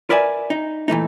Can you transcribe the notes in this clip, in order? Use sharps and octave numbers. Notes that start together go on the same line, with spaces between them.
A#4 B4 D5 E5 G#5
D#4
A#2 E3 A3 D#4